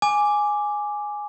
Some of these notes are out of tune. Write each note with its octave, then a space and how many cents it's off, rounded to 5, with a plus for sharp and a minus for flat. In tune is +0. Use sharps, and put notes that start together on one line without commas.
G#5 +0 D6 +0